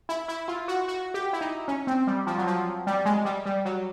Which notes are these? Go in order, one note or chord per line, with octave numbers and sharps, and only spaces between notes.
E4
E4
F4
F#4
F#4
G4
E4
D#4
C#4
C4
G3
F3
F#3
F3
G3
G#3
G3
G3
F#3